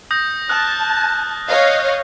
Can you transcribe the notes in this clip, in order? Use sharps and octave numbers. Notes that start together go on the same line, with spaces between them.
D#6 G6 A#6
A5 D#6 F6 F#6
C#5 D#5 F5